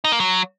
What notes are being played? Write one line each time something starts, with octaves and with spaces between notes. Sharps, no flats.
D#4
A#3
F#3